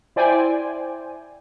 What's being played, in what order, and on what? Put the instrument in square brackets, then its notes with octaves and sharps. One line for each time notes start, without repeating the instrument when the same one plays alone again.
[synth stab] E4 C5 D5 G5 G#5